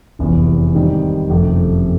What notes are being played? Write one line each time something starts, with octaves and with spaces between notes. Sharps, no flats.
F1 E2 C3 E3
G#2 D#3 G3 C4 D#4
F#1 F2 C3 F3 A3